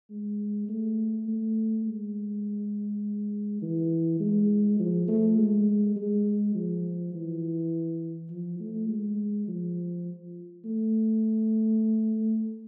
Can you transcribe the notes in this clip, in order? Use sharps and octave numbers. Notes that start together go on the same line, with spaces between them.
G#3
A3
A3
G#3
E3
G#3
F3
A3
G#3
G#3
F3
E3
F3
A3
G#3
F3
A3